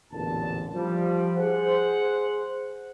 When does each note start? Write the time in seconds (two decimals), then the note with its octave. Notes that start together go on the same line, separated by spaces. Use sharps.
0.12 A1 E2 A#2 D3 A5
0.74 F3 G3
1.36 G#4 C5 F#5